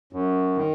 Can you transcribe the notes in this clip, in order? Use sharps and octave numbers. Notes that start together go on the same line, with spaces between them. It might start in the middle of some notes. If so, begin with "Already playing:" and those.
F#2
D#3